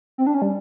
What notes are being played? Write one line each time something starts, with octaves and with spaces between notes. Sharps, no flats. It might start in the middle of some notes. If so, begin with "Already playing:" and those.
C4
D4
C#4
G3